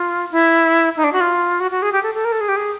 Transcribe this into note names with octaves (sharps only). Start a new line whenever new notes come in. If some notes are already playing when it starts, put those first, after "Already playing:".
Already playing: F4
E4
D#4
D4
F#4
F4
F#4
F#4
G#4
G4
A4
A4
A#4
A4
G#4
G4
G#4